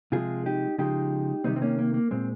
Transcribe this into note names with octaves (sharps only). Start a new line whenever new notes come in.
C3 F3 G#3 F4 G#4
D#4 G4
C#3 F3 G#3 D#4 G4
C3 D#3 G3 C4 D#4
C4
A#3 C#4
A#3
A#3
A#2 G#3 C4